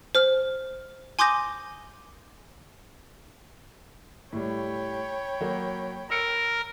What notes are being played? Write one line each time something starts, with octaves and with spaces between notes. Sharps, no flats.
C5 F6
G#5 C6 D6 D#6 G6 A#6
A2 G3 C#5 G5 B5
F#3 A#3
A#4 E6 C#7 D7